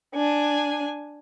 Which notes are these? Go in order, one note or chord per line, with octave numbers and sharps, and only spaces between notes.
D4 G#5